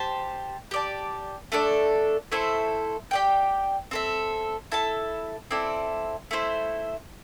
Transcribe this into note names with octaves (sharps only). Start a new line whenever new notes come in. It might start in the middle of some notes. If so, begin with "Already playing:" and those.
Already playing: G4 C5 A5
G4 D5 A5
A3 D4 A4 D5
A3 E4 A4 C5
G4 D5 G5
C4 A4 E5
E4 A4 E5 A5
C4 E4 A4 D5
A3 E4 C5